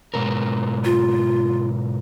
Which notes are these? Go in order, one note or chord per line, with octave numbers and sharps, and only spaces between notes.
G#2 B2 A#4
F4